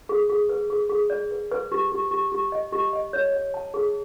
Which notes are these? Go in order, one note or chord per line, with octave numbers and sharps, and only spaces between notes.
G#4
G#4
B4
G#4
G#4
D5
B4
B4
G4
G4
G4
G4
D#5
G4
D#5
C#5
C#5
A5
G#4